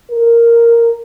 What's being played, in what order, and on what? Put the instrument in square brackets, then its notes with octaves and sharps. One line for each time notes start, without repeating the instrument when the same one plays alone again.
[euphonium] A#4